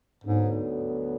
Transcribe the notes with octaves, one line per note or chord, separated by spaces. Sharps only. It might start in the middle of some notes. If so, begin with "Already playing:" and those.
D2 G#2 D3 F#3 B3